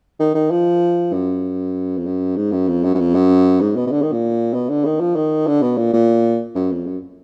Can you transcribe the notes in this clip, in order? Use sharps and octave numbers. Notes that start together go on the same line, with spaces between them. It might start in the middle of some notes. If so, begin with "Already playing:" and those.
D#3
D#3
F3
F#2
F2
F#2
G#2
F#2
F2
F#2
F#2
F2
F#2
G#2
B2
B2
D3
D#3
A#2
B2
D3
D#3
F3
D#3
D3
B2
A#2
A#2
F#2
F2
F#2